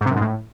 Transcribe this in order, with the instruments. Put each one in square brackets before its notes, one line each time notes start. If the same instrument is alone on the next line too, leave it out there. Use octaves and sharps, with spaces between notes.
[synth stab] G#2
C3
F#2
G#2
A2